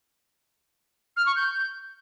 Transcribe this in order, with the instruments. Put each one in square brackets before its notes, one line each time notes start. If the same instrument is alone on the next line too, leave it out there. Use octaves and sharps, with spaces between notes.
[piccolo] F6
C#6
G6